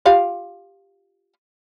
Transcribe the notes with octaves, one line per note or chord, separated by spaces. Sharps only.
F4 G4 F5